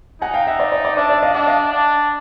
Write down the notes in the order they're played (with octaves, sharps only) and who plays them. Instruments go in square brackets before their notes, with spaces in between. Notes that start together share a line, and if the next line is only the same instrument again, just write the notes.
[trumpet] D#4 [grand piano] F#5 G#5
[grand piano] F5 G5
E5 F#5
D5 E5
D5
D5
[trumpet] D4 [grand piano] D5 E5
[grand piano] D5 E5
D#5 F5
[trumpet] D4 [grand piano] E5 F#5
[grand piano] D#5 F5
[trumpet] D4